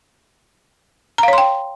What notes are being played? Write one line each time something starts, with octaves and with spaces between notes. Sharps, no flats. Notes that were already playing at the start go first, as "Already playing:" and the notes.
C#5 F5 G5 A#5 C6